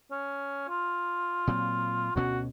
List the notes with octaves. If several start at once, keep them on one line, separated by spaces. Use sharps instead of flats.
C#4
F4
A#2 F#3 C4
D2 B2 C#4 F#4